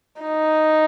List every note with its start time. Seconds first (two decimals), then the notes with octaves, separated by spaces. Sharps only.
0.21 D#4